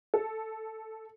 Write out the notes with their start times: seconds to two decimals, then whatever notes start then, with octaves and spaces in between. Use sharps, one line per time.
0.14 A4